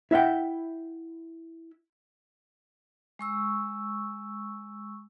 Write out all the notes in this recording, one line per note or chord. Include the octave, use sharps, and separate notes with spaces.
E4 E5 F#5 G5
G#3 C#6 E6